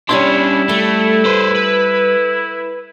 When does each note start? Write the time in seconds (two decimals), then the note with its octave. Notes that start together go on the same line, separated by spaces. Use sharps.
0.09 G3 C#4 D4 E4 C#5 C6
0.69 A3 A4
1.25 B4 C5
1.55 B4